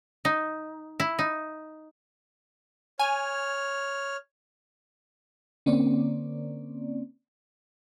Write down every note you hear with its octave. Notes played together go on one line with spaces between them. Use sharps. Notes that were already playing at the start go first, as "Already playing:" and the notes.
D#4
E4
D#4
C#5 G#5 F6
D3 A#3 C4 C#4 D5